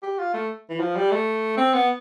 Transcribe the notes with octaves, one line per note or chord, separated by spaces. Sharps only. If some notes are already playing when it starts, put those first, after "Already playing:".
G4
F4
A3
E3
F3
G3
A3
C4
B3